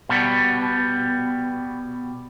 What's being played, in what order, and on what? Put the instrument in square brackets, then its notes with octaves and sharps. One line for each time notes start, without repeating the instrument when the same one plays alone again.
[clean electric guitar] B2 G3 B3